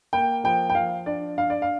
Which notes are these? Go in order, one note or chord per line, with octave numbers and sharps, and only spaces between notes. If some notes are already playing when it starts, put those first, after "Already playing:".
A#3 G5
F3 G5
G5
F3 F5
D4 D5
D4 F5
D5
F5